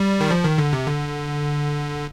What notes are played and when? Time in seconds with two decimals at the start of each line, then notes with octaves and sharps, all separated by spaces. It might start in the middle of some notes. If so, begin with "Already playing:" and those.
Already playing: G3
0.20 D#3
0.31 F3
0.44 D#3
0.58 D3
0.73 C3
0.87 D3